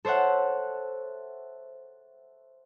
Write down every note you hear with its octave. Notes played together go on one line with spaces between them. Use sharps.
A4 C5 C#5 E5 F#5